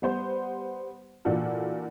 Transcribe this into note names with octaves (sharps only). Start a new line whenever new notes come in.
G3 B3 C5
A#2 E3 D4 F4 F#4 A4